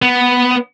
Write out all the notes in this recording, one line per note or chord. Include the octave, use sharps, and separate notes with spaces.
B3